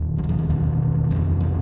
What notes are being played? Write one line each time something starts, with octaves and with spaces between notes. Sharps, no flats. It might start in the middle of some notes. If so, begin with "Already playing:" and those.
Already playing: E1 D#2
F#3
E3
F3
E3
E1 E2 B2 D#3
F1 F2 C#3
E3